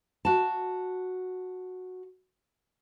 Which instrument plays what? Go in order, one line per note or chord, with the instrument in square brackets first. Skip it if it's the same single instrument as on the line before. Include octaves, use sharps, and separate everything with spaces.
[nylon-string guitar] F#4 A5